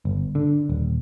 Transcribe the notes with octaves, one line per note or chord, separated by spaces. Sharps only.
G1
D3
D#1